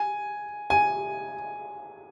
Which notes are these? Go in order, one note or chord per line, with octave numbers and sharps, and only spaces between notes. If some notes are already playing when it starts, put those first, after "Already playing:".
Already playing: G#5
G#5